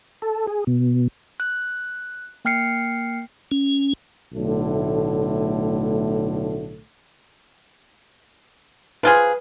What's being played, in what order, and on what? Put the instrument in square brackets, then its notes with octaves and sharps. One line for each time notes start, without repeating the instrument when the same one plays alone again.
[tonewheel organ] A4
G#4
B2
[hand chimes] F#6
A#3 G5 F6 C7 C#7
[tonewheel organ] C#4
[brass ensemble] B1 A2 D3 A3
[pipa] F3 F4 G#4 [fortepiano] B4